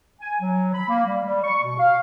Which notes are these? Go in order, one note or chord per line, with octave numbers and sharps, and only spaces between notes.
G#5
F#3
B5
A#3
G3
G3
C#6
B2
F5